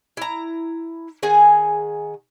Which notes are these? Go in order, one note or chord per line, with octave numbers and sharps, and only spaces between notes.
E4 A#5
D#3 G#4 F#5 G#5